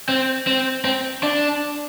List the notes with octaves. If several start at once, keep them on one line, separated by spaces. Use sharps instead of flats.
C4
C4
C4
D4